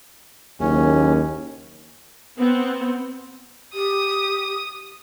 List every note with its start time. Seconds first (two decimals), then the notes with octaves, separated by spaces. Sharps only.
0.60 F#1 D#2 C#4
2.36 B3 C4
3.74 G4 D#6